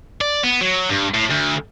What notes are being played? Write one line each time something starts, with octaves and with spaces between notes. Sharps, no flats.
D5
B3
F#3
G2
A2
D2